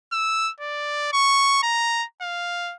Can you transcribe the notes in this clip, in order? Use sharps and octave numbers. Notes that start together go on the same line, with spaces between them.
E6
D5
C#6
A#5
F5